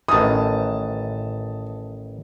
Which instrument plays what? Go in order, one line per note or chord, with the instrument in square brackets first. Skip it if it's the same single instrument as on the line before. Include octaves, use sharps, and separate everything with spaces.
[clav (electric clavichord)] A1 D#3 E3 [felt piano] A5 D#6